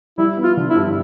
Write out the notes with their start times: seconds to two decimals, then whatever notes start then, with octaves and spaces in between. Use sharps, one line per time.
0.18 G3 E4
0.37 B3
0.44 F4
0.57 D3
0.69 E4
0.76 G2